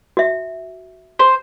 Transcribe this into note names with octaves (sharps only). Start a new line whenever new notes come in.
F#4 E5
C5